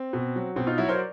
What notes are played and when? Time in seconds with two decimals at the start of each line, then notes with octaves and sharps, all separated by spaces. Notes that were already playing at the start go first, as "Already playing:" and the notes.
Already playing: C4
0.13 B2
0.36 F#3
0.56 B2 C4
0.67 D#4 F4
0.78 F#3 E4 F#4
0.85 C#5
0.89 A#4 C5
0.95 D5